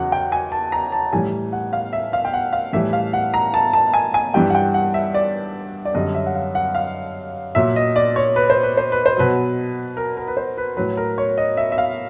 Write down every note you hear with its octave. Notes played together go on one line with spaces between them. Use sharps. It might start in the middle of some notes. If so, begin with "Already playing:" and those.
Already playing: E2 C#3 F#3 F#5
G5
G#5
A5
A#5
A5
A2 E3 G3 G#5
F#5
F5
E5
F5
G5
F#5
F5
A2 E3 G3 E5
F5
F#5
A#5
A5
A5
G#5
G#5
G2 E3 G3 G5
F#5
G5
F#5
E5
D5
D5
F#2 D3 G3 D#5
E5
F#5
F5
F#5
F5
A#2 F#3 E5
D#5
D5
C#5
B4
C5
B4
C5
B4
C5
B2 F#3 B4
A#4
A#4
B4
C5
B4
A2 F#3 B4
A#4
C#5
D#5
E5
E5
F5